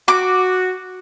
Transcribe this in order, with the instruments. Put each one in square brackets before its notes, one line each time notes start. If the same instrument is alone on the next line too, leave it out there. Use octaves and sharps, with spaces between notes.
[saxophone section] F#4 [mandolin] D6